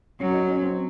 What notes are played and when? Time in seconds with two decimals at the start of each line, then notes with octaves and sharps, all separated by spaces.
0.20 F#3 C#4
0.34 D#4
0.48 C#4
0.62 C4